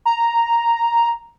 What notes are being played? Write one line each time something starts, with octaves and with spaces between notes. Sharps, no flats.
A#5